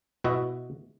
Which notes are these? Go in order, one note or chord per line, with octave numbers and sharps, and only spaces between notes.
B2 E4 F#4 D#5 E5